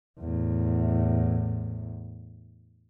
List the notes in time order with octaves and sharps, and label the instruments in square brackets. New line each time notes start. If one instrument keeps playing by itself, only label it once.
[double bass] E2 A2